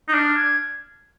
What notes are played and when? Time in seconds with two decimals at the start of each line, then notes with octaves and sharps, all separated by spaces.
0.08 D#4
0.13 D4 F6
0.36 G#6